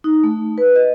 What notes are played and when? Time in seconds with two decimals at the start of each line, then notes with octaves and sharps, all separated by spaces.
0.04 D#4
0.24 A3
0.58 B4
0.76 D#5